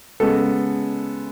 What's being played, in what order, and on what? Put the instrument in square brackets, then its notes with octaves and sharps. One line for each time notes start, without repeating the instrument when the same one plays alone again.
[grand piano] C#3 G#3 B3 A4